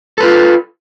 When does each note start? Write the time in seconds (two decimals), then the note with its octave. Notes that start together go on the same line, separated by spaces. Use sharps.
0.18 A4
0.20 B4
0.23 F4